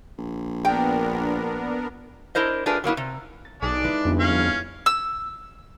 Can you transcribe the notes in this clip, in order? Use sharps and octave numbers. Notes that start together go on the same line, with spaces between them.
A#1
B3 D4 A#4 G5
D4 E4 A#4 C5 D#5
A3 D4 F4 G#4 A#4 B4
F#3 A#3 B3 E4
C3
A6
B1 D4 D#4 G#4 D5 G#5
G#3 E4 B4
G1 F2
C#4 F5
E6